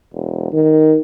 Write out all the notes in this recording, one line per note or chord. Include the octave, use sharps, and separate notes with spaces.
E1
D#3